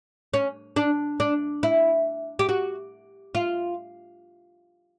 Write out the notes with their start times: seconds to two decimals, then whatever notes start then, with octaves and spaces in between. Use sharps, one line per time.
0.34 C#4
0.76 D4
1.20 D4
1.63 E4
2.39 G4
2.49 F#4
3.35 F4